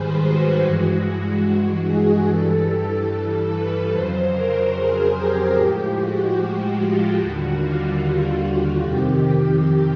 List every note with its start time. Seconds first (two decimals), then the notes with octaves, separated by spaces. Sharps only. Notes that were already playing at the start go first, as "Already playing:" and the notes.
Already playing: G#2 D#3 G3 G#4 B4 C5
0.22 F#4
0.62 G2 E3 G#3 F#4
1.86 G#4
2.27 G2 E3 G3 A4
2.68 A4
3.09 A4
3.50 B4
3.91 F2 C#3 F#3 C5
4.32 A#4
4.73 G#4
5.13 G4
5.54 A2 F3 G#3 G4
5.96 F#4
6.37 F#4
6.78 F4
7.19 D#2 D3 G3 F#4
7.59 F4
8.42 F#4
8.82 F2 C3 D#3 G4